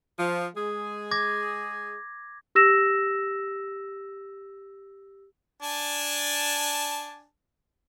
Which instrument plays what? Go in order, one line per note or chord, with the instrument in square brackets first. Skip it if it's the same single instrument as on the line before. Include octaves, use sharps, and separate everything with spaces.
[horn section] F3
G#3 G#4
[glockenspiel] D6 G#6 A#6
[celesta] G4 E6 A#6 E7
[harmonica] D4 G#5 A5